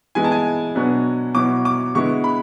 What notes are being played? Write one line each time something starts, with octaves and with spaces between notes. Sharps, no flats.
E3 G#3 B3 E4 G#5
A5
G#5
B2 F#3 B3 D4
B2 F#3 B3 E4 D6
D6
D3 G#3 B3 E4 C#6
B5